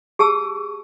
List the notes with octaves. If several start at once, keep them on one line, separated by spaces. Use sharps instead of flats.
G4 G#4 A5 E6